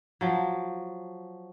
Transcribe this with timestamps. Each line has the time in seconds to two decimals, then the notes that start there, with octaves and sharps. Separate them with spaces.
0.21 F3 F#3